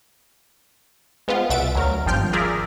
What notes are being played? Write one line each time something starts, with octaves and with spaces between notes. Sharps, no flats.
G#3 B3 C4 F4
C2 B2 E5 F#5 A6 D7
D2 F#3 A#4
G#1 G2 F3 G5 F6 G6
F4 G#4 A#4 D5 E5